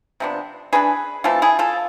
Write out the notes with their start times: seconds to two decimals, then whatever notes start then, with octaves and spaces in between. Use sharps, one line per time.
0.20 C3 F3 B3 D4
0.73 E3 B3 D4 G#4 B4
1.24 E3 A3 C4 F4 A4
1.42 E4 G#4
1.59 F4 A4